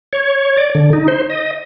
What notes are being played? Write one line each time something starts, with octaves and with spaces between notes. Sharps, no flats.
C#5
D5
D3
D#4
C5
D#5